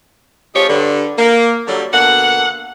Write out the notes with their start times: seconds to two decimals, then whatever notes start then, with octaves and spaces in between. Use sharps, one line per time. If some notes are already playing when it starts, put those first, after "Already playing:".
0.55 F2 F3 G#3 F4 G4 C#5
0.69 G2 D3
1.18 A#3
1.68 D3 F#3 G3
1.93 B2 D3 A#3 F#5